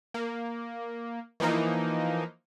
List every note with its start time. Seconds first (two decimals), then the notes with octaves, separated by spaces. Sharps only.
0.14 A#3
1.40 E3 F3 A#3 D#4